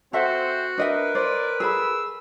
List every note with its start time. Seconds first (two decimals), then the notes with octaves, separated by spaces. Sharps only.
0.13 C4 F#4 A4 C5 E5 F#5
0.78 D4 A#4 B4 D#5 E5
1.15 C5 D5
1.60 G#4 A4 B5 E6